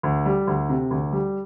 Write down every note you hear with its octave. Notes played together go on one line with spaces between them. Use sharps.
D2
G3
D2
C3
D2
G3